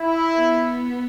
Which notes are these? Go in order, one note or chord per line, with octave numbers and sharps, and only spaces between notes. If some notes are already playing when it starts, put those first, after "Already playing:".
Already playing: E4
B3